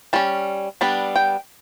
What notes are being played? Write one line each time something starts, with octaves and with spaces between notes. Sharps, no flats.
G3 C#4 A5
G3 B3 D4 A5
G5